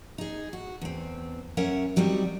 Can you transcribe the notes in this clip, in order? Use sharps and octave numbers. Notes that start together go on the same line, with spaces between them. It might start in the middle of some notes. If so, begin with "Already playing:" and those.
D#4 G#4
F#4
E2 C4
F#2 C#4 A#4 C#5 E5 F#5
F#3 G3 C4 D#4 F#4